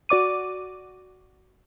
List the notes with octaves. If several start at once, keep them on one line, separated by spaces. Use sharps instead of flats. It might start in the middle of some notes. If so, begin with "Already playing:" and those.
F#4 D5 D6 D#7